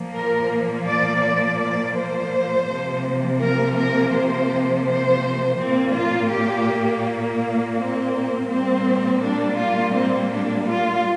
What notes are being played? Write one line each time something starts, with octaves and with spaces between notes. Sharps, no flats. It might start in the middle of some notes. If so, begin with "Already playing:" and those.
Already playing: A#2 F3 A#3
A#4
D5
D5
D5
C5
C3 F3 A#3
A#4
A#4
C5
C5
A#2 A#3 C4
F4
G4
C4
A#2 G3 A#3 C4
D4
F4
C4
D4
F4